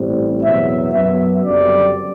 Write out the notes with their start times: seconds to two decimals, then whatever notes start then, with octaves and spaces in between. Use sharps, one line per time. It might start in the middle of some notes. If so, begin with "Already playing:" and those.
Already playing: A1 A2 G3 C4
0.43 E2 B2 F#3 B3 E5
0.93 F#2 F#3 B3 E5
1.43 F#1 F#2 D3 G3 C4 D5